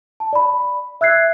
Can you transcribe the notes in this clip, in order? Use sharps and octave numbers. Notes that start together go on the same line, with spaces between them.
A5
D5 B5
E5 E6 F#6 G#6 C7